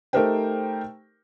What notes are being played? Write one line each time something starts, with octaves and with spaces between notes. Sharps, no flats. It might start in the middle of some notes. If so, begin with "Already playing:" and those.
A3 D#4 G4 A#4 C5 G5